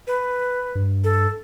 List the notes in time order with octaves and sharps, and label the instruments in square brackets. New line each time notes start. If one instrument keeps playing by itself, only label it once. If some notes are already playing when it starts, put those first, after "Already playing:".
[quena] B4
[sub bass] G2
[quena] A4